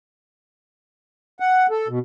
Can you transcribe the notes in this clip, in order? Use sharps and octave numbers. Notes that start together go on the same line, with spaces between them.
F#5
A4
B2